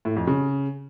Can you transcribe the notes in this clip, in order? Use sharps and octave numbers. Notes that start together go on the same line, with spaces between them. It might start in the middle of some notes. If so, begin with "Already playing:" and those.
A2
F2
C#3